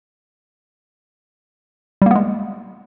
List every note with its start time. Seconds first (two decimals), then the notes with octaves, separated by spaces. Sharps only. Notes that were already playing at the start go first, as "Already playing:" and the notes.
2.02 G3
2.06 A#3
2.11 B3
2.15 G#3